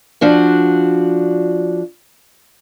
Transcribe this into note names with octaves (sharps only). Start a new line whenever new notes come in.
F3 D4 F#4